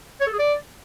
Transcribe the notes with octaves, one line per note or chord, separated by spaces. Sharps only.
C#5
A4
G#4
D5